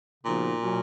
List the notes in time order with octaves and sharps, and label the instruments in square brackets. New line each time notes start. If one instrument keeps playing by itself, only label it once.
[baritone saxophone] A#2 [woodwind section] C#3 F3 B3 D#4 F#4
[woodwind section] B2 F#3 C#4 F#4